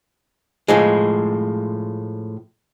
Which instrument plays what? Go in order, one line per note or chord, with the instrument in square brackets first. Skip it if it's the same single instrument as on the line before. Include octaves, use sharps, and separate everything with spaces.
[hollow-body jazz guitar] A2 F3 G#3